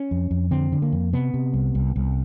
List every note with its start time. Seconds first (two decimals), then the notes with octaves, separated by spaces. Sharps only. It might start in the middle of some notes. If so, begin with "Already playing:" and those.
Already playing: C#4
0.11 F2
0.31 F2
0.51 D3 C4
0.72 D3
0.82 A#3
0.92 F2
1.13 C3 B3
1.34 C3
1.53 C2
1.75 C2
1.96 C2